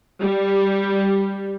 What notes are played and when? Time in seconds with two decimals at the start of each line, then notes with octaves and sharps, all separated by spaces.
0.20 G3